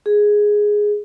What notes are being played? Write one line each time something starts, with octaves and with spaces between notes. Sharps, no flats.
G#4